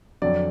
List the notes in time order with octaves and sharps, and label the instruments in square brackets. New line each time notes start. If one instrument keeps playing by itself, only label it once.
[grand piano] F2 D3 F#3 D5